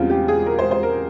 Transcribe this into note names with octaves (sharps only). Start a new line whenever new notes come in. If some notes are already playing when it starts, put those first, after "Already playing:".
Already playing: E2 C#3 G3 C4 F4
G4
G#4
A#4
C5
C5
A#4